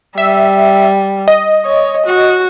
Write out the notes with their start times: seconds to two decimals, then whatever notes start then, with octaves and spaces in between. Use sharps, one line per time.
0.18 G3 E5
1.28 D#5
1.65 C#5
2.06 F#4